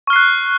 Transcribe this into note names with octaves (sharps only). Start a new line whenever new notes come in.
C#6 F6 F#6 C7